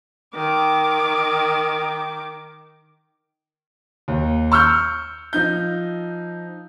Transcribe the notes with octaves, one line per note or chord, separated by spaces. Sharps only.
D#3 D6
D#2
C#6 E6 F6 G6
F3 D#4 G6